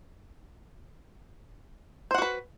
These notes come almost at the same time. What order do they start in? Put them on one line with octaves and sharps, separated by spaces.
C5 F#5 F#4 B4